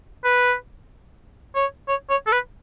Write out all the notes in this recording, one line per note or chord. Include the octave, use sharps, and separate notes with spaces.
B4
C#5
C#5
C#5
A4
B4